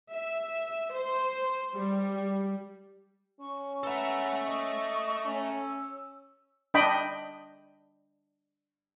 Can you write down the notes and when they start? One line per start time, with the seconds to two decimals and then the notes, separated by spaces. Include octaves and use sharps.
0.11 E5
0.94 C5
1.74 G3
3.40 C#4 C#6
3.84 A4 B4 E5 F#5 A#5
4.44 D#5 C#6
5.26 C#4 A#5
5.59 E6
6.74 D4 D#5 G5 B5